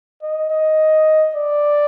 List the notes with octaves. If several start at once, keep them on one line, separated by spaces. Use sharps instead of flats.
D#5
D#5
D5